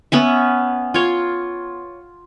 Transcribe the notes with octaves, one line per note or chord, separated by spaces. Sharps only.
B3 C#4 E5
F4 C#5